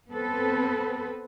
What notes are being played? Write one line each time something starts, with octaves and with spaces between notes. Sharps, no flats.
B3 C4 A4 B4